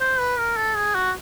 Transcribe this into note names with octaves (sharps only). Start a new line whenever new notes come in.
C5
B4
A#4
A4
G#4
F#4